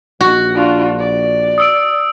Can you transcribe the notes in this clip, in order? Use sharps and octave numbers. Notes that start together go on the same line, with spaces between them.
A#1 F#4
D4 F4
D5
D#6 E6 D7